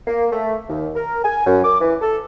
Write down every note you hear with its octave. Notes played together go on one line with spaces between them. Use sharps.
A#3
A3
D#2
A#4
G#5
F#2
D6
E3
A4